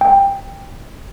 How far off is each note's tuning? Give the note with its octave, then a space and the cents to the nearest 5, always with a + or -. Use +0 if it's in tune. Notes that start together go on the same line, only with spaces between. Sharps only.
G5 +15